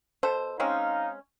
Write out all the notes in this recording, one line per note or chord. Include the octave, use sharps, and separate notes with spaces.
B2 A4 C5
G#3 C4 C#4 D#4 F5